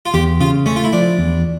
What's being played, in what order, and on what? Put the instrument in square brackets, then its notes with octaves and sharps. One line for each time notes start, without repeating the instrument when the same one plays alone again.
[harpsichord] F4
[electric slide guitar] E2 [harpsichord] G4
[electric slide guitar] C#3 [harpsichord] F4
[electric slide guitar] A3 [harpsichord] C#4
[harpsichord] F4
E4
[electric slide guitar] F3 [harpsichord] D4
[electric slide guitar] E2